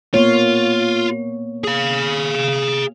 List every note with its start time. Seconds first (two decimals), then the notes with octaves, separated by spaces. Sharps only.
0.14 A#3 B3 F4 C#5
1.64 G#4 F5